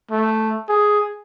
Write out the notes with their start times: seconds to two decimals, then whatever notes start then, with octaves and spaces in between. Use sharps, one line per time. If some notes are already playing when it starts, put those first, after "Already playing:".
0.11 A3
0.69 G#4